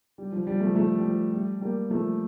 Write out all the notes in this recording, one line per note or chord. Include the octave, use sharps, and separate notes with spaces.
G3
F3
G3
F3 A3
F3 A3
G3
F3
G3
G3 A#3
F3 A3